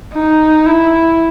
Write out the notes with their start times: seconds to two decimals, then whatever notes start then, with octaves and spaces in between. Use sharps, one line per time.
0.14 D#4
0.66 E4